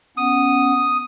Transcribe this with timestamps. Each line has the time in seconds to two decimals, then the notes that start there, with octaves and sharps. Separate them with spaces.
0.17 B3 C#4 F#5 D#6